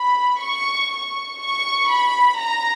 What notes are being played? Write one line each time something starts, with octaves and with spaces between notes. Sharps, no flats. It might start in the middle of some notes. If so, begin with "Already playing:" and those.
Already playing: B5
C#6
C#6
C#6
B5
A#5